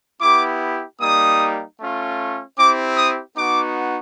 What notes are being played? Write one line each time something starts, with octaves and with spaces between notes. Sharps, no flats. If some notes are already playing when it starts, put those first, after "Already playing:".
B3 E4 G4 D6
G3 A#3 D#4 D#6
A3 C#4 F4
C4 E4 G4 D6
D#6
B3 D#4 F#4 D6